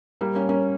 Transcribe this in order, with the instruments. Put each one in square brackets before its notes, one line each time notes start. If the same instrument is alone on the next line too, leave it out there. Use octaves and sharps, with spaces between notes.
[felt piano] G3 A#3
A#3 C#4
A#3 C#4